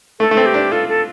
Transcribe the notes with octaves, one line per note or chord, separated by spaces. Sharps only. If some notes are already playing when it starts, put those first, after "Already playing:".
A3 A4
A3
C4
G4
D4
F4 A4
A4